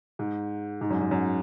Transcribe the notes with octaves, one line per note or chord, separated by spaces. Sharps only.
G#2
G#2
F#2
F#2
F#2